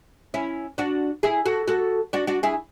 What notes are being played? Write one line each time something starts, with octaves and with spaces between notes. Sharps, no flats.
C#4 E4
D4 F#4
E4 G#4
F#4 A4
F#4 A4
D4 F#4
D4 F#4
E4 G#4